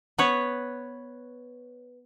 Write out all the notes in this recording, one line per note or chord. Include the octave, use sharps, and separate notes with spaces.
B3 B4 C#5